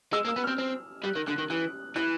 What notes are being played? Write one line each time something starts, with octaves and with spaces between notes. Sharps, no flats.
G#3 E6
A#3
E6
B3
C4 F6
C4
G3 F#6
D#3
D3 F#6
D#3
E3 F#6
E3 F#6